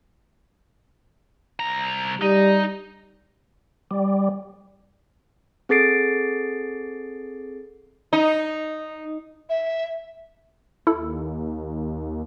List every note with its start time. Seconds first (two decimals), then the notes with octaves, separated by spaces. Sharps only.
1.60 C2 A#5
2.22 G3 D#4
3.91 G3
5.69 C4 G#4 A4 A6 C7 D7
8.13 D#4
9.49 E5
10.87 D#2 E4 A4